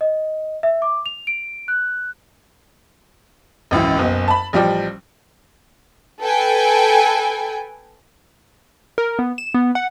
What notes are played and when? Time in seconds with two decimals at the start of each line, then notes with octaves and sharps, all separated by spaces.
0.01 D#5
0.63 E5
0.82 D6
1.06 F7
1.27 D7
1.68 F#6
3.71 G#1 C#2 F#2 E3
3.97 F#1 B1 B3
4.28 A5 B5
4.53 A1 F3 G3 D5 G5
6.21 A4 B4 G5 G#5
8.98 A#4
9.19 B3
9.38 E7
9.54 B3
9.75 F#5